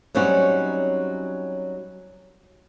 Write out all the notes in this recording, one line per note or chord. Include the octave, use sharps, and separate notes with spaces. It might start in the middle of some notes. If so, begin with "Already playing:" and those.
F#3 G3 C4 C#4 D#4 F#4